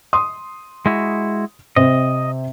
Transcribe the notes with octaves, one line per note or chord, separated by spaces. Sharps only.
C6 D#6
G#3 E4 F#4
C3 C4 C5 D#5